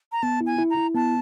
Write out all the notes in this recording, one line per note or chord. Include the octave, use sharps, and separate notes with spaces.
A#5
B3 A5
E4
G#5
E4
A#5
E4
B3 A5